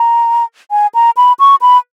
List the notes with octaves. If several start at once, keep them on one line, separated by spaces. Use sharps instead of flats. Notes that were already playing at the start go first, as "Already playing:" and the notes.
Already playing: A#5
G#5
A#5
B5
C#6
B5